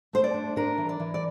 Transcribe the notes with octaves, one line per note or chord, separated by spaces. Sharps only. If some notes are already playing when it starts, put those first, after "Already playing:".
A3 C5
D5
D4
D4 A#4
E3
D5
E3
D5